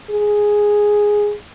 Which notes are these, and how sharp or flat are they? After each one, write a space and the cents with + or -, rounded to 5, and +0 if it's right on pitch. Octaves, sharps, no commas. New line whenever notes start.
G#4 +0